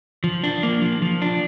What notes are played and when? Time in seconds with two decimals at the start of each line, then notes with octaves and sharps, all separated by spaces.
0.24 F3
0.44 D4
0.63 A#3
0.82 F3
1.02 F3
1.22 D4